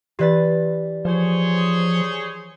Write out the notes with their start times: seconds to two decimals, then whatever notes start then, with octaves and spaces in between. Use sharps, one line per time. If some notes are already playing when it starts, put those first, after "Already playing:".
0.19 E3 G4 B4 D5 A6
1.05 F3 G#4 C5 C#5